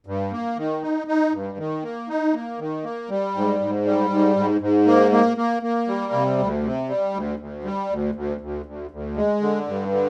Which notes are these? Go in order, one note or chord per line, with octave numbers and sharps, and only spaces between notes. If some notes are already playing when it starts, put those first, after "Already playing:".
G2
A#3
D#3
D#4
D#4
G2
D#3
A#3
D#4
A#3
D#3
A#3
G3
G#2
G#2
G3
G#2
G#2
G#2
A#3
A#3
A#3
A#3
G3
C3
D2
C3
G3
D2
D2
G3
D2
D2
D2
D2
D2
G#3
D3
G2
D3